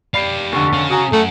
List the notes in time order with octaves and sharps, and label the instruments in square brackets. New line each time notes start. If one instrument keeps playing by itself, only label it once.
[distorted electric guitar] G4 F5 [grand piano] D5 B5 C7
[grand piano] F1 D3 [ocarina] C#6
[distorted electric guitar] C#4 F5
[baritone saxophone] F#4 [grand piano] G#5 D#6 [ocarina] A#5
[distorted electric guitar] F#2 F#5 [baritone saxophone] A3